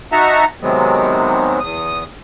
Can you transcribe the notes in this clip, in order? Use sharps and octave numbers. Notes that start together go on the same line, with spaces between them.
D#4 F#4 E5 F#5 A5 A#5
C3 D#3 F#3 G#3 B3 C4
E2 D#6